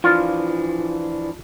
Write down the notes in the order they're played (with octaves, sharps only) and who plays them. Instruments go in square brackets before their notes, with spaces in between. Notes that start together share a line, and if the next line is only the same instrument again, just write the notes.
[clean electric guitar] E3 F3 D4 [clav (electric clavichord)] F4